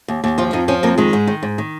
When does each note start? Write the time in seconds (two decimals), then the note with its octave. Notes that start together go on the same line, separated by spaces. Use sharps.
0.08 D#2
0.24 D#2
0.38 F3 F4
0.53 F2 D#4
0.68 F3 C#4
0.83 F2 A#3
0.98 D#3 G#3
1.13 G#2
1.27 D#3
1.43 G#2
1.58 D#3